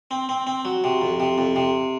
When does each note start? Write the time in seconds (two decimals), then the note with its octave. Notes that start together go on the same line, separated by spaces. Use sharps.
0.11 C4
0.29 C4
0.47 C4
0.65 F#3
0.84 C3
1.01 F2
1.20 C3
1.38 F2
1.56 C3